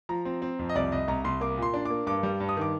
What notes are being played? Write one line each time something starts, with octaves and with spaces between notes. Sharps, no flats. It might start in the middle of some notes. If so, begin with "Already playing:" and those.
F3 A#5
C4
C4
F2
D#5
C2 D5
C2 D#5
C2 A#5
C2 C6
A#3 D6
A#2 C6
D4
A#3 D6
G2 D6
G3
G2
D#6
D#3 D6